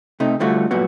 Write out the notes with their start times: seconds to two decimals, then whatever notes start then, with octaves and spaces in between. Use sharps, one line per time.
0.20 C3 A3 D#4
0.40 D3 G3 A3 F4 F#4
0.71 G2 A#2 F#3 B3 F#4